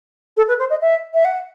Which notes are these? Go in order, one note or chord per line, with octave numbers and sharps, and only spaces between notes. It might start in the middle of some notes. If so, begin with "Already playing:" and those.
A4
B4
C5
D#5
E5
E5
F#5